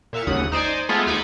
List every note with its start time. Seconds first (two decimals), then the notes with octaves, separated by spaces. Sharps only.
0.13 A#2 E5 F5 C#7
0.27 G#1 D#2 C#3 F#5 D#6
0.52 D#4 C5 D5 G#5
0.89 G#3 A3 B3 F4 G#4 A4
1.06 D#2 D#4 G#5 B5 D6 C#7